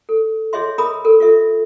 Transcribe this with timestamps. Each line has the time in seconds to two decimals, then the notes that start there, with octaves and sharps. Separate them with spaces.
0.09 A4
0.53 G#4 C#5 D#5 E5 C6
0.78 E4 G#4 A#4 B5 D#6
1.05 A4 A#4
1.20 F4 A4 E5